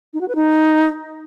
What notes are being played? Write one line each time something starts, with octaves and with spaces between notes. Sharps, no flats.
D#4
F#4
B4
D#4